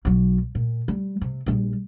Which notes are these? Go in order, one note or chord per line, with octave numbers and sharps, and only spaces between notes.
B1 F#3
A#2
G3
C3
A#1 G3